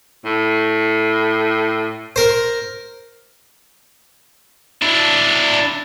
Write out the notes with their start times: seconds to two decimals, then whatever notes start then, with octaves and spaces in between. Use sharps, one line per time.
0.25 A2
2.16 A#4 C5
4.82 D4 E4